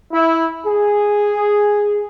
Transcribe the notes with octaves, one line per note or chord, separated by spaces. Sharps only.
E4
G#4